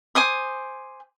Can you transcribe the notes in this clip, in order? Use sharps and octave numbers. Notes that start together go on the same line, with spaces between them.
C5 G#5 D6 D#6